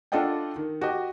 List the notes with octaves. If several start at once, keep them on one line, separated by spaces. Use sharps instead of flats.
D4 F4 A4 D#5 F#5 G5
D#3
F#4 G4 D#5